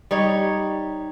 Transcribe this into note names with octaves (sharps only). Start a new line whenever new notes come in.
G3 D#4 C#5